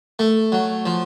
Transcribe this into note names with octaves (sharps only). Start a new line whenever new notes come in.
A3
F#3
F3